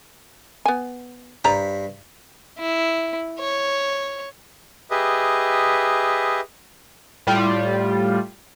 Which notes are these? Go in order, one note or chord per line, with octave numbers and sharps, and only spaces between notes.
B3 G#5
G2 C5 D5 A#5 B5
E4
C#5
G4 G#4 B4 D#5 E5
A2 G3 F4